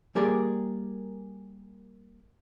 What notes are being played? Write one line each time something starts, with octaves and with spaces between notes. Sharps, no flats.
G3 A#3 G4 G#4 A#4 D5